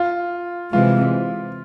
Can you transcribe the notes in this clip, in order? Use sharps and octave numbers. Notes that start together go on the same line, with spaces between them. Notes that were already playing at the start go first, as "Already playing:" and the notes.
Already playing: F4
C3 E3 G#3 F4